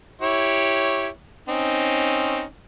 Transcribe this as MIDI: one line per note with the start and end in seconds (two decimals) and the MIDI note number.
0.21 1.08 64
0.21 1.08 67
0.21 1.08 73
1.48 2.44 60
1.48 2.44 61
1.48 2.44 63